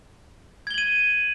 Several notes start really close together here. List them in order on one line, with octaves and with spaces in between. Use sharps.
G#6 G7 F#7 D#7